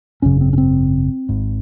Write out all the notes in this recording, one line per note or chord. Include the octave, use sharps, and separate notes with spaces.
G#1 F#2 C#3 C#4
C4
C#4
C4
G#1 G#2